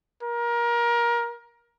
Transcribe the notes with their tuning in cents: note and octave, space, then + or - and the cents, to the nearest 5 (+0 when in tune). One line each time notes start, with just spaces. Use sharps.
A#4 +25